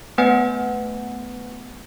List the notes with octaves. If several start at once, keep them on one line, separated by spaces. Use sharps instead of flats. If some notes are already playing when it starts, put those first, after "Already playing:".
A3 B3 B4 F#5 G#5